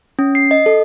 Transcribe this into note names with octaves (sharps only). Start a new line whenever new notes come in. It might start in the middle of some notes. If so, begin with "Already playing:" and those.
C#4
C7
D#5
A4